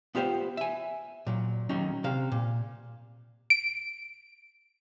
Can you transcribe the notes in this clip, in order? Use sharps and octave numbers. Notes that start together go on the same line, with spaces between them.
B3 F4 G4 A4 C5
E5 G#5
A#2 F#3
D#2 F#3 C#4 D#4
C3 C5 F5
A#2
D7